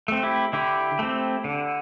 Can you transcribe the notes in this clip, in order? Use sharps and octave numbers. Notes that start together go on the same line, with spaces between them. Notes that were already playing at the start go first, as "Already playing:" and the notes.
A3 C4
E4 G4
D3 E4 G4
A3 C4
D3